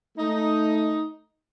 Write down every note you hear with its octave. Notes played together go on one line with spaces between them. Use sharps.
A3 D#4